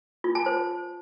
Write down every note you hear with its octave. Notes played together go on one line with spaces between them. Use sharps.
F4
A5
C5